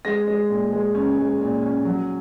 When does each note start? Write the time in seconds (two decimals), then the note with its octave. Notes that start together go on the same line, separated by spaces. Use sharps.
0.05 G#3 A#6
0.28 G#3
0.49 A#2
0.72 G#3
0.95 C#4
1.18 G#3
1.41 A#2
1.63 C#4
1.85 F#3